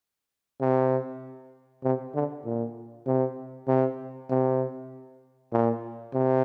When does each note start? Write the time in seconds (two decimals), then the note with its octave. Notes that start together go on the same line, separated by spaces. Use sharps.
0.61 C3
1.84 C3
2.14 D3
2.45 A#2
3.06 C3
3.68 C3
4.30 C3
5.52 A#2
6.13 C3